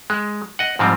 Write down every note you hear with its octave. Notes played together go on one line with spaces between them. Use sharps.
G#3
D#5 F#5
G#2 F3 G3 C4